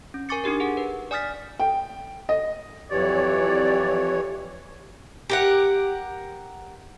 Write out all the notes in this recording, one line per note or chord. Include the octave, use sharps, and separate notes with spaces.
C#4
A#4 G#5 C#6 D6 A6 C#7
D4 D#4 G4 A#4
G#4 F#5
B4
D5 G#5 D#6 F6 A6 B6
G5
D#5
F2 E3 F#3 G4 C#5 D5
G4 A#4 F#5